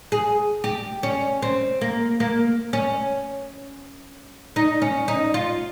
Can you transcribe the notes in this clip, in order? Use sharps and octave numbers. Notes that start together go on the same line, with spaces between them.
G#4
G4
C#4
C4
A#3
A#3
C#4
D#4
C#4
D#4
F4